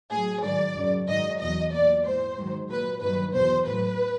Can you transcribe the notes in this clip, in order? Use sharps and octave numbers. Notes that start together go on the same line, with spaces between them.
A2 F#3 G#4
G#2 D#3 F#3 D5
F#2 C#3 F#3
G#2 D#3 F#3 D#5
E2 B2 F#3 D#5
A#2 F#3 D5
G#2 E3 C5
G#2 D#3 F#3
A#2 F#3 B4
G2 D#3 F#3 B4
E2 B2 F#3 C5
A2 F#3 B4